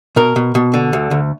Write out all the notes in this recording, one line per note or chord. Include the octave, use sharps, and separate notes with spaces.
B2 A#4
B2
B2
D3
D2
D2